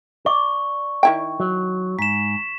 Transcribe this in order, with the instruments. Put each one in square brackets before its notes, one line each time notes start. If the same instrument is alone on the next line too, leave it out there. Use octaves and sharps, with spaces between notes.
[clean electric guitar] D5 [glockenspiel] C#6
[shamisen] D#3 E4 G5
[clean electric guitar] F#3
[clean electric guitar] G#2 [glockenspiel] B6 E7